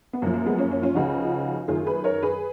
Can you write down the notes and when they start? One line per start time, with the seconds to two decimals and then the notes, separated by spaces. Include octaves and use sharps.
0.13 B3
0.22 F#2 F3 A#3
0.34 A#3
0.46 G#3 B3
0.58 A#3 C#4
0.71 A#3 C#4
0.83 C#4 F4
0.95 C#2 C#3 F3 D#4 F#4
1.68 F#2 D#3 F4 G#4
1.87 G#4 B4
2.04 A#4 C#5
2.22 G#4 B4